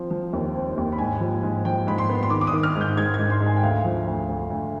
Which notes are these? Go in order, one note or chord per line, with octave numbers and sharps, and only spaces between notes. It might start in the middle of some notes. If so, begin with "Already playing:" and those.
Already playing: F3 C4
F3
D#2
C4
D#2
B5
G#2 G#5
F3
G#2
F3 G5
G#2 B5
C6
B3
C6
D#3 D6
D6
D#6
D#3
F6
G#2
G6
G#2 G#6
G#6
G#2
C6
G#2
G#5
G5
D2 F5
F3
D2
D2
D2